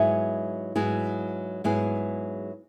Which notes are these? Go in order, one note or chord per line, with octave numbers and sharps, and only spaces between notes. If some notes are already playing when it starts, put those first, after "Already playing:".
Already playing: G#2 F#3 B3 E4 G#4 E5
G#2 F#3 B3 E4 G#4
G#2 F#3 B3 E4 G#4